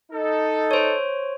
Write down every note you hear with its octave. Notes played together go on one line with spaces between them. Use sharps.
D#4 A4
C5 C#5